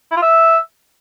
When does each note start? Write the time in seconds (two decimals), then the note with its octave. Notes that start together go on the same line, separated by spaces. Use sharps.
0.11 E4
0.17 F4
0.22 E5